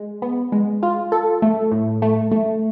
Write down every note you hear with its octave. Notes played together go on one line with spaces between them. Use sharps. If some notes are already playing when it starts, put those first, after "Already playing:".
Already playing: G#3
B3
G#3
F4
A4
A3
A2
A3
A3